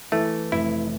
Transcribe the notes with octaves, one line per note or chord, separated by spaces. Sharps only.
E3 A3
F1 E4